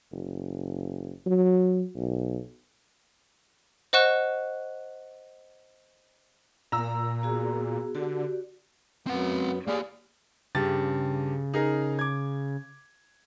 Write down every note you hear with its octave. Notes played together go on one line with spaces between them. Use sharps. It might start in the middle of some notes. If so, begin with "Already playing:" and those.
F#1
F#3
B1
C5 D#5 F#5 C#6 F#6 E7
A#2 A#5 E6
B3 F#4 G#4
D3 F#4 G4 D5
F#2 B3 C4 F#5
A#3 G4 G#4 D5 F5
G2 C#3 G4 A6
D#4 G#4 A#4
D6 G#6